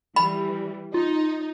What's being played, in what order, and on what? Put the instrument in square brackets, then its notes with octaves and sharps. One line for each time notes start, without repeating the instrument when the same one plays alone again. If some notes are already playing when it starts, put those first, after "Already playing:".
[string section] E3 G3 [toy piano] B5
[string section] D#4 [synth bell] F4